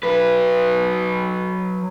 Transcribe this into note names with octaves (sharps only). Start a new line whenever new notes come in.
F#3 B4